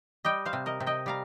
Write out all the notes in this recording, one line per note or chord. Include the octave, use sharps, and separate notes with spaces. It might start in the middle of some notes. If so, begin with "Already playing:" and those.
G3 D#5 G5
C5 F5
C3
A#4 D#5
C3
D#5 G5
G3 F5 A#5